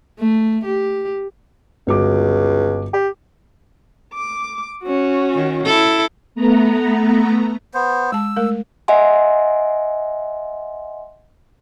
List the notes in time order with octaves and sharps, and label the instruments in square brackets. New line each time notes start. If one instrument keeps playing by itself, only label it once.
[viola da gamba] A3
G4
[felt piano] G1 F#4 D6 [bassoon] C#2
[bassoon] G4
[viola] D6
C#4 F#4
[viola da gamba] D#3
E4 A4
[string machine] A3 B3 A#5
[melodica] B3 C5
[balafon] G#3 A5 [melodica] E6
[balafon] G#3 A3 A#4
[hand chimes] D#5 E5 F#5 G#5 C6